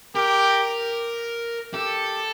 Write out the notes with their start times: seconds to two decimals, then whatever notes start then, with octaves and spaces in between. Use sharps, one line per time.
0.15 G4 A#4
1.73 G4 A4